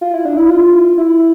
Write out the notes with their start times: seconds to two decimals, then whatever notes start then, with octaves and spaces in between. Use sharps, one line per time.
0.01 F4
0.14 E4
0.25 D4
0.37 E4
0.49 F4
0.98 E4